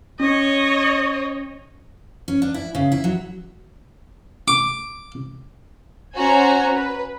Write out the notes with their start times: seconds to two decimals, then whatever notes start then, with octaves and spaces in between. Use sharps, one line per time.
0.20 C#4 C#5 D#5
2.28 C#4
2.42 D4
2.54 E4
2.75 C#3
2.92 E4
3.04 F#3
4.48 D6
6.17 C#4 F#4 C5 G#5 A#5
6.75 B4